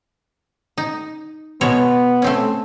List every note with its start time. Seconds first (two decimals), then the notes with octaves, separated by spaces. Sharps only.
0.78 D#4
1.61 B2 G#3 B3 C#5
2.22 A3 C4 C#4